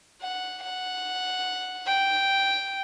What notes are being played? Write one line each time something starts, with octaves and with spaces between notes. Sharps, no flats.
F#5
F#5
G5